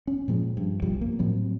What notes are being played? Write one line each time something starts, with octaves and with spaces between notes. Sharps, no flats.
C#4
A#2 F3 G#3
G2
B1 F#2 F3 G3
A#3
A2 F3 F#3 C4